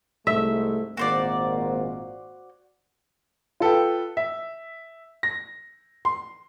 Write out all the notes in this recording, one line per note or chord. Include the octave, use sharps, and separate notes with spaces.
C2 G#2 A3 E5
G#1 A#2 A#3 F#4 C5 D5
F4 A4 B4 G5
E5
A#6
C6